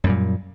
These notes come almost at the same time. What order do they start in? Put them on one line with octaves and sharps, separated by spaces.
F#2 G3 A#2